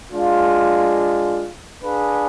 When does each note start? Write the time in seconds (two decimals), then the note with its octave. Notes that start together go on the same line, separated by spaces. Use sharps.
0.11 G#3 D4 F4
1.84 D4 G#4 B4 F5